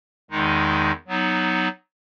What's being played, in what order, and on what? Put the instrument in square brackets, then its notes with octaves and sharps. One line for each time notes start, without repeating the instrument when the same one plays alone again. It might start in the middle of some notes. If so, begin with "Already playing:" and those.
[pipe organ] E2 D#3 G#3 D#4
F#3 B3 D#4